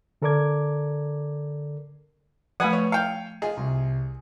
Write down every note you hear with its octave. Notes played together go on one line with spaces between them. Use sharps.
D3 A4 A#4 D5 D6 G#6
F3 A3 B4 F#5 G#5 B5 G#6 D#7
C#5
F5 G5 C#7
F4 G#4 D#5
C2